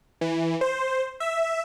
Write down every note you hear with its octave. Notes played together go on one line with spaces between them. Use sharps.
E3
C5
E5